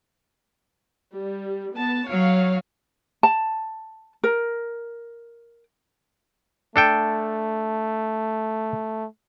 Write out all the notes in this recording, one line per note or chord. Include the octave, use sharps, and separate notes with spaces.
G3
B3 A5
F#3 C#5 F5
A5
A#4
A3 D4 A4 G5